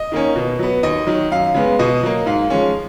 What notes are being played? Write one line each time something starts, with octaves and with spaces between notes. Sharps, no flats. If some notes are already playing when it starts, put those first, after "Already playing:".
Already playing: D#5
D#3 A#3 C#4
B2
F#3 B3
D#2 D#5
D#3 F#3
F#2 F5
C#3 G#3 B3
B2 D#5
F#3 A#3
G#2 F5
F3 G#3 C#4